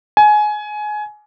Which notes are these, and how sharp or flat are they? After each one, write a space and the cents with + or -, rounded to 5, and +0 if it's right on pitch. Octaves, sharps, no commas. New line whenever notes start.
G#5 +20